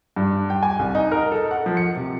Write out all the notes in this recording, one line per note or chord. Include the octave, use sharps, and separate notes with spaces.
G2
G5
G#5
C2
D#4
A#4
A4
F#5
F3
C#7
C3